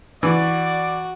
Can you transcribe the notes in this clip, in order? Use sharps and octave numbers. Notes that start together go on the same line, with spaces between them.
E3 F#4 D5